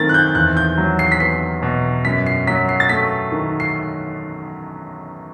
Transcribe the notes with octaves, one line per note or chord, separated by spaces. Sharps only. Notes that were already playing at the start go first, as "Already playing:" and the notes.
Already playing: F#2 D#3 A3 C4 A6
F#6
G6
E2 F#6
G6
F#3
C7
B6
B3 C7
B2
F#2 B6
C7
F#3 B6
C7
A6
A3 B6
D#3
C7